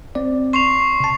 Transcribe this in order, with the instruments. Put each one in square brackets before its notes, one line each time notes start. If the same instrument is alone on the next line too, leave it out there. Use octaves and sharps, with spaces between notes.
[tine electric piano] C4 D5
[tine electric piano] C6 [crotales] C#6 C7 F7
[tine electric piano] C3 A5